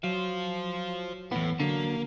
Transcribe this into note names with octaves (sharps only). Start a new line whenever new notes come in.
F#3 C5 F5
E2 A2 B3
D3 F#3 A#3